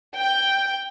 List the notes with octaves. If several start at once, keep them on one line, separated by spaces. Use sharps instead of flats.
G5